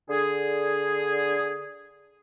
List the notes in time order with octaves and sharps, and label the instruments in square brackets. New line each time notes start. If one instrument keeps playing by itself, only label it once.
[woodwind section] D3 G#4